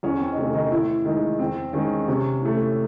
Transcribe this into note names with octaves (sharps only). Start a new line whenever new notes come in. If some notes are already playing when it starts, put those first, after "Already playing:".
E2 C#4
C4
D#4
C3 D#3 A3 C#4
D#3 D#4
A2 E3 E4
D#3 G#3 D#4
E2 C4
D#3 G#3 C#4
C3 C#4
E3 A3